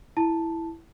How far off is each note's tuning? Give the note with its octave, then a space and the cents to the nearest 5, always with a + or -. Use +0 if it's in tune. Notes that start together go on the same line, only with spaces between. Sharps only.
E4 +0 A5 +0